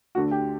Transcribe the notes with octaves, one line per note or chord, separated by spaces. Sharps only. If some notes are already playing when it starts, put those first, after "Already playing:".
D2 D3 F#4
G4